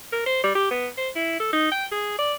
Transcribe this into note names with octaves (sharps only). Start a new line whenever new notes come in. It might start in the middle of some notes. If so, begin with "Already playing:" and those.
A#4
C5
G3
G4
B3
C5
E4
A4
D#4
G5
G#4
D5